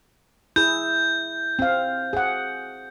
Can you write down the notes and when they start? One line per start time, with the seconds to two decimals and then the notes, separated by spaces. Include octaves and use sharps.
0.56 E4 G#4 G6
1.59 C4 F5
2.13 G#4 F#5